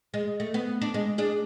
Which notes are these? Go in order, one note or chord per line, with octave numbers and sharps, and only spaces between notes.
G#3
A3
B3
D4
G#3
D4 G#4